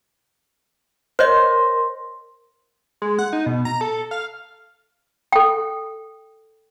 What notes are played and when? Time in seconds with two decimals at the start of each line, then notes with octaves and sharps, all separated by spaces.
1.19 A#4 C5 C#5 D#5 C6
3.02 G#3
3.19 F#5
3.33 D#4
3.46 B2
3.65 A#5
3.81 A4
4.11 F5
5.32 A4 G5